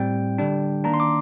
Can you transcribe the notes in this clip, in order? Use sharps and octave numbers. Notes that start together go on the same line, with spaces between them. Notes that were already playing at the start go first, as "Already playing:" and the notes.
Already playing: A2 G3 C4 G5
D3 G3 D4
D#3 A#3 D4 A#5
C6
D6